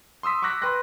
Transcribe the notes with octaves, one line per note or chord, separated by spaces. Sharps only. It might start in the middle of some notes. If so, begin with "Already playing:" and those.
C6 D#6 E6 B6
C#6 D6 E6 F#6 A#6 B6
B4 G5 C6 F#6 A#6